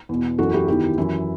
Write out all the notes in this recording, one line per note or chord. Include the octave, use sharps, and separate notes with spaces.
E2 B2
F#2 E3 F#4 A4
E4 G4
E2 D#3 E4 G4
F#2 E3 E4